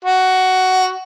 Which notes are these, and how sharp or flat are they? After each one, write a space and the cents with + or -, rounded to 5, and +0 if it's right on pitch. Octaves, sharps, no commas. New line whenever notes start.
F#4 +10